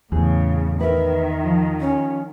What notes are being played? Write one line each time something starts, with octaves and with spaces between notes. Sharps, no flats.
E2 A2 C#3 G#4
D#3 A#4 B4 E5
F3
C#4